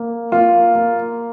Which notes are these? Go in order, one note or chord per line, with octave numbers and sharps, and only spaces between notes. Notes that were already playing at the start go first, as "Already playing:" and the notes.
Already playing: A#3
A#3 F4
A#3